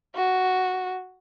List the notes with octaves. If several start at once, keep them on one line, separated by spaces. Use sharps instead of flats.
F#4